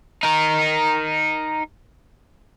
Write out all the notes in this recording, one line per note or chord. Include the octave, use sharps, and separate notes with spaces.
D#4 A#4